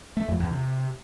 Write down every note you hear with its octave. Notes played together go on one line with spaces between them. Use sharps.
A3
F2
E2
C3